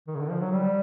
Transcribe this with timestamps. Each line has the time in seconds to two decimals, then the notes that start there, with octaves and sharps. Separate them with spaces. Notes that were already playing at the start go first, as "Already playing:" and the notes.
0.07 D#3
0.15 C#3
0.19 D3
0.30 F3
0.40 F#3
0.52 G3